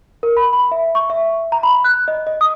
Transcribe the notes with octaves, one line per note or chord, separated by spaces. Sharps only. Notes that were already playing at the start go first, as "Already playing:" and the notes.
A#4
B5
B5
E5
C#6
E5
A#5
B5
F#6
D#5
D#5
D#6